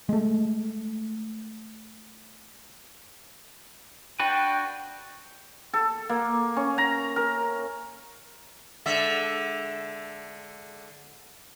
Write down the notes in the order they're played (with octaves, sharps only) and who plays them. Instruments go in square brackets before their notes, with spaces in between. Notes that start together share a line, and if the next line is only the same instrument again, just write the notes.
[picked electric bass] G#3 A3
[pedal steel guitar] D4 F#4 B4 [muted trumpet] G5
[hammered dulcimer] A4
A#3
C#4
A#5
A#4
[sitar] D3 G#3 E5